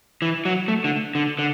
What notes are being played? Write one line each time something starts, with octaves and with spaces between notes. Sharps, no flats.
E3
F#3
A3
D3
D3
D3